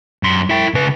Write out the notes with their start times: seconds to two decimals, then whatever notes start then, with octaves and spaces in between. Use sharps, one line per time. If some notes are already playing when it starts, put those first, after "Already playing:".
0.23 F#2 C6
0.50 E4 G5
0.74 C#3 B4